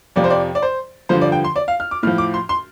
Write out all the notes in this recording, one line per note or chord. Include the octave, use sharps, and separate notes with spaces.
F2 C3 F3 D5
C5
D5
D5
C5
G2 D3 F3 C5
D5
G5
C6
D5
F5
F6
D6
A2 F3 F6
D6
C6
C6